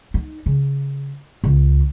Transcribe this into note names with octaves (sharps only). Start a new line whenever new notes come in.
D#4
C#3
C#2